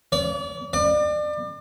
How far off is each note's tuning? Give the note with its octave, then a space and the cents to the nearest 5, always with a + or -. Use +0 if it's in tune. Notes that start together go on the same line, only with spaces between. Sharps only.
D5 -40
D5 +35